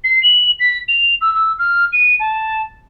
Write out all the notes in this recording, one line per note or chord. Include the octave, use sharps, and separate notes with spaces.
C7
F#7
B6
F7
E6
E6
F6
D#7
A5